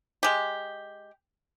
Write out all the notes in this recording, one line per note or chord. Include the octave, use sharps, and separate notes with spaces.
G#3 G4